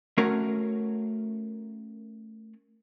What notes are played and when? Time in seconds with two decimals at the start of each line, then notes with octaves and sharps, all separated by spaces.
0.18 A3 C#4 F#4 A#4 C#5